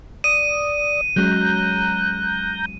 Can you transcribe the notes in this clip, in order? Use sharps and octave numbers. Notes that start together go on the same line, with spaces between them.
D5 D#6 D#7
F#3 G#3 C#4 A#5 F#6 G6